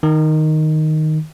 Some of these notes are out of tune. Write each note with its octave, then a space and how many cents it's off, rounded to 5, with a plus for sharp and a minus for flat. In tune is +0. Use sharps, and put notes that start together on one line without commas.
D#3 +0